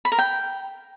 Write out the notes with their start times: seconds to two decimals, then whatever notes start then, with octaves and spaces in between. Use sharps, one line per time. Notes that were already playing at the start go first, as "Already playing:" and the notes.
0.05 B5
0.12 A#4
0.18 G5